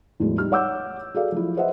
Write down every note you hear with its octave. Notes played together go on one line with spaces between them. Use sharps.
E2 A2 F3 F#3 G#3
G3 D#4 F6
C#5 F#5 D6 E6 G6
F#4 G#4 A4 D5 F5
F3 F#3 E4
G#4 B4 C5 D#5 E5 F#5